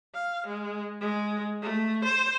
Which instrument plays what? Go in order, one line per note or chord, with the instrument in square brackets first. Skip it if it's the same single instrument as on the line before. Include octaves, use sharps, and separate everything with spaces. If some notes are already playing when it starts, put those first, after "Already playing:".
[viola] F5
G#3
G#3
A3
C5